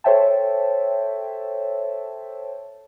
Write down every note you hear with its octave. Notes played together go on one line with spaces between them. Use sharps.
A4 C5 C#5 E5 G5 A5